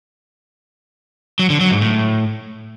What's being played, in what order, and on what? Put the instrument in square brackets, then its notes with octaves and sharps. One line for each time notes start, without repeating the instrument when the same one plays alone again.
[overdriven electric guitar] F#3
D3
F#3
G#2
A2